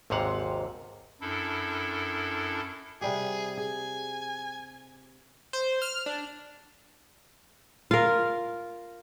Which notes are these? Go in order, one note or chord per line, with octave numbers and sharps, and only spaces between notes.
G#1 D#2 G#2 C3 F5 F#5
F#2 D4 E4 A4
C3 G3 G4 G#4
G#4 G#5
C5
F6
D4
F4 A#4